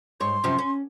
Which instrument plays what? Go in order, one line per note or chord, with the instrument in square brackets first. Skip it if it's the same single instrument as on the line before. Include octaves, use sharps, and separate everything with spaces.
[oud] G#2 C#5 [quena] C6
[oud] F#2 C3 F3
C#4